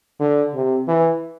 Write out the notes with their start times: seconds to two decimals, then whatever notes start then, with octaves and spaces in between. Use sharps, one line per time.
0.20 D3
0.54 C3
0.88 E3